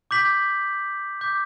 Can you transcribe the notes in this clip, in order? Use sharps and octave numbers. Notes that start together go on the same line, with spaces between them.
D6 G6 B6 F#7
D6 G6 B6